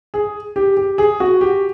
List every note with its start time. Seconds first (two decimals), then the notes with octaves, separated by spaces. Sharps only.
0.14 G#4
0.56 G4
0.77 G4
0.98 G#4
1.20 F#4
1.41 G4